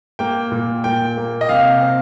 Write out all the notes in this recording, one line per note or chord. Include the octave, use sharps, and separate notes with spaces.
A#3 G5
A#2
A#2 G5
A#3
D#5
C3 F5
C4